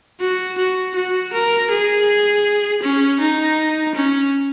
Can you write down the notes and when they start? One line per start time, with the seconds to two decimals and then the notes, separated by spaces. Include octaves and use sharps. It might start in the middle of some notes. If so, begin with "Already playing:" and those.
0.21 F#4
0.58 F#4
0.95 F#4
1.33 A#4
1.70 G#4
2.83 C#4
3.20 D#4
3.95 C#4